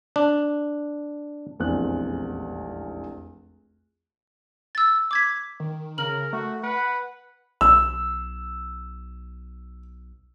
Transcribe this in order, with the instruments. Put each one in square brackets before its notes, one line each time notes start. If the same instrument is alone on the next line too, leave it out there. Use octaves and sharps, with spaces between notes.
[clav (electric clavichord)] D4
[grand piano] F1 A#1 E2 G#3 C4 F#6
[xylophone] E6 A6
D6 G#6 B6
[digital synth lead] D#3
[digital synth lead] C#3 [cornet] A#4 [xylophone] F6 F#7
[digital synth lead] A3 [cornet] F#4
[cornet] B4 [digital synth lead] F#5
[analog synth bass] B1 [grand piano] E6